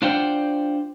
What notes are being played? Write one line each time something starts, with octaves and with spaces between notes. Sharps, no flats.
D4 F4 C5 D5 F#5 G5